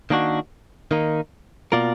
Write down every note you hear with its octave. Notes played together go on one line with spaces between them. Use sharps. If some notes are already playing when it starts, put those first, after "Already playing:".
D#3 A#3 D4 F#4
D#3 A#3 D#4
B2 A#3 F4 A#4 D5